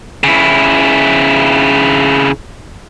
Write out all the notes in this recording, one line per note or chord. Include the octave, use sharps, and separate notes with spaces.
C#3 E4